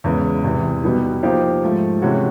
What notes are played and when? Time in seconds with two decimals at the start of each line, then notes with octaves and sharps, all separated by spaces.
0.04 E2 C#3 E3 G#3 B3
0.44 E2 C3 E3
0.84 B2 G3 B3 D#4
1.23 F3 A#3 D#4 G4 C5
1.63 G#2 F3 A3
2.02 C3 E3 G#3 C#4 F#4